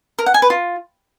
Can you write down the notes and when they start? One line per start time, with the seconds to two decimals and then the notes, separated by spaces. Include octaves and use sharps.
0.19 A#4
0.26 F#5
0.34 G#5
0.42 B4
0.50 F4